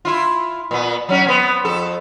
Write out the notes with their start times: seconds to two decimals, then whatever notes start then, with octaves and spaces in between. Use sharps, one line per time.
0.05 E4 F4
0.71 A#2 B3
1.09 F#3 C#4 F#4
1.26 B3 C4
1.65 F2 A4